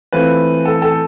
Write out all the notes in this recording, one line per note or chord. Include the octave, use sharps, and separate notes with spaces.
E3 A3 C4 F4 B4
A4
A4